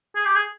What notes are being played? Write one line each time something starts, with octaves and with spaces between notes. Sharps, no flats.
G#4
G4
G#4